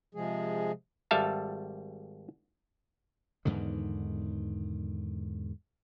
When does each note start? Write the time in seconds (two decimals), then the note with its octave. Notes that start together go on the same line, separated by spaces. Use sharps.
0.15 C3 F3 G#3 G#4
1.11 G#1 G3 A4 E5 F5 A5
3.45 E2 G#2 D3 D#3